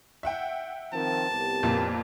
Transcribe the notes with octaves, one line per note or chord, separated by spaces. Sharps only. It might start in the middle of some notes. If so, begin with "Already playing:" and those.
E5 F#5 G5
D#3 F3 C4 A5
C2 B3 G4
F2 A#2 A#3